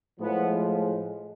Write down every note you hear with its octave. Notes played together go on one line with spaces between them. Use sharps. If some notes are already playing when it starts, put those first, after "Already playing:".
A2 F3 G#3 B3